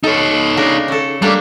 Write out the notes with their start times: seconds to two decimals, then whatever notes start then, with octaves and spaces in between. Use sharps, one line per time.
0.04 D#4 A4 C#5
0.57 C#3 D4 A#4
0.88 C#4 A4
1.22 G3 A3 A#3 D4